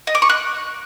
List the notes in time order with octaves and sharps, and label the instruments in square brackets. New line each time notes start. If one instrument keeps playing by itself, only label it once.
[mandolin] D#5
D6
C#6
F#6